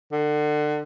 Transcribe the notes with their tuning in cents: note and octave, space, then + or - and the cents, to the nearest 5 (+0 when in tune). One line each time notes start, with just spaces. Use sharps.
D3 +30